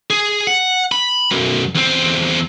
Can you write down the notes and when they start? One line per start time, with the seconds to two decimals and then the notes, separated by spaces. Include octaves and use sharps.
0.10 G#4
0.47 F#5
0.92 B5
1.31 B1 F#2
1.75 E2 C4